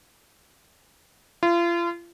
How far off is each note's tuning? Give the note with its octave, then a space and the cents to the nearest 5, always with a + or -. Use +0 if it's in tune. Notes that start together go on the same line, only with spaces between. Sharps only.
F4 -35